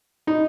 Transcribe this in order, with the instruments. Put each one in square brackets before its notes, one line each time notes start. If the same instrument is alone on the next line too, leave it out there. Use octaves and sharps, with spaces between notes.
[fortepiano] D#4